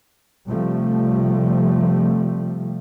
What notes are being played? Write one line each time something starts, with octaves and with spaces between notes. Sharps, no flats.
C3 F3 G3 A3